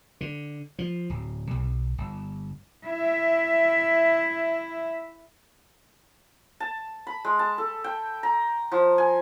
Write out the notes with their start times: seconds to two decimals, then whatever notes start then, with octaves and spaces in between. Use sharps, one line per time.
0.21 D3
0.79 F3
1.10 D1
1.51 B1
1.98 G1
2.86 E4 E5
6.60 A5
7.07 B5
7.25 G#3
7.39 A5
7.58 A4
7.84 G5
8.23 A#5
8.72 F3
8.98 G#5